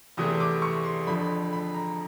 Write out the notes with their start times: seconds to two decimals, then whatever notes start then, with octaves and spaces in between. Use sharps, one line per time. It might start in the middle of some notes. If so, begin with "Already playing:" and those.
0.17 E2 C3 E3 A3 D#6
0.40 D6
0.62 C#6
0.84 C6
1.07 F2 D3 F3 B5
1.53 B5
1.74 A#5